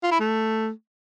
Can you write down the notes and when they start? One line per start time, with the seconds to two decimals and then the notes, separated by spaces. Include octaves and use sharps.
0.03 F4
0.12 E4
0.20 A3